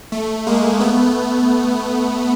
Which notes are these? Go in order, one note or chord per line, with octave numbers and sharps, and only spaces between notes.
A3
G#3 A#3
A3 B3